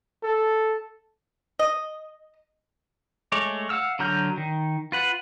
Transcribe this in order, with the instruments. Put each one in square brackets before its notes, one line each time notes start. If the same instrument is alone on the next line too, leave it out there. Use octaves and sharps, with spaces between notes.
[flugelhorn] A4
[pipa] D#5
[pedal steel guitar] G#3 A3 C#5 D6
F5 F#5 E6 F6
D3 F#3 A#5 F6 G6
D#3
F4 B4 F#5